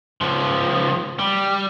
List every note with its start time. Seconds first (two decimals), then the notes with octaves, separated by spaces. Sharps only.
0.21 C#2 F3
1.19 G3